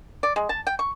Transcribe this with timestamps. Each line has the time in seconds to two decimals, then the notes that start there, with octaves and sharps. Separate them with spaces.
0.23 D5
0.36 G#3
0.49 A5
0.67 G5
0.79 C#6